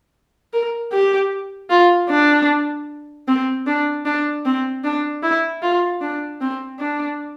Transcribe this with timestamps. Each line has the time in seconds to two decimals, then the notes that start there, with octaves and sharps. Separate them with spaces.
0.53 A#4
0.93 G4
1.70 F4
2.10 D4
3.28 C4
3.67 D4
4.06 D4
4.45 C4
4.84 D4
5.23 E4
5.62 F4
6.01 D4
6.41 C4
6.80 D4